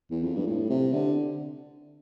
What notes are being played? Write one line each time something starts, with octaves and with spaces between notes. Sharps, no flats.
E2
F2
G2
A2
C3
D3